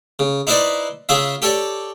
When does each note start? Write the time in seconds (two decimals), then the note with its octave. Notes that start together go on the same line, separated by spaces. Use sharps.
0.19 C#3
0.47 D#4 E4 B4 C5 D5
1.09 C#3 F4 G#4 E5
1.42 G4 A4 C#5 D5